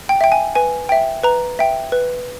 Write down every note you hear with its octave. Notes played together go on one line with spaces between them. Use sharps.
G5
E5 G5
G#5
B4 G#5
E5 G5
B4 A#5
E5 G5
B4